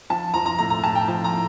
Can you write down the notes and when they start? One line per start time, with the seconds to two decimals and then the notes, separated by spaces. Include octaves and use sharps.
0.10 F3 A5
0.34 F3 A#5
0.46 A#5
0.59 A2 A#5
0.70 A#5
0.83 A2 A5
0.95 G5
1.07 F3 A5
1.24 A#5
1.32 A2